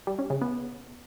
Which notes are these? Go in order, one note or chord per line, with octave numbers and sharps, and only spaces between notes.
G3
C#4
C#3
B3